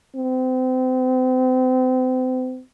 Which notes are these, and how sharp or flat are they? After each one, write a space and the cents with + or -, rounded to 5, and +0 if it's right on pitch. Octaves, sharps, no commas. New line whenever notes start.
C4 -35